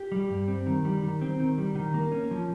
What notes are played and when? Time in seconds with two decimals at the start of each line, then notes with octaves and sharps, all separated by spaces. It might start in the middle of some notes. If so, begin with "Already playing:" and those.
Already playing: G4
0.12 G3
0.30 G2
0.48 C4
0.66 D#3
0.85 G3
1.03 D#3
1.21 C4
1.40 D#3
1.58 G3
1.75 D#3
1.94 A#3
2.12 C#4
2.31 F3